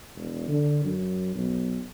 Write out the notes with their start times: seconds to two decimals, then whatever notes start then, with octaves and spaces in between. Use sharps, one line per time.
0.16 E1
0.48 D3
0.84 F#2
1.35 B1